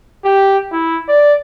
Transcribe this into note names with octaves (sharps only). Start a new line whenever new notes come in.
G4
E4
D5